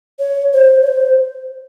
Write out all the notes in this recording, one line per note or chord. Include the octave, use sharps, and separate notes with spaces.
C#5
C5
C#5
C5